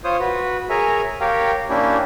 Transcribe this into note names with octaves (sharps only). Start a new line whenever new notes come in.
F4 C5 C#5 D#6
F#4 B4
G#4 A#4 C#5 E5 G#5 A#5
G4 A#4 C#5 F5 G5
A#3 C#4 D4 E4 G4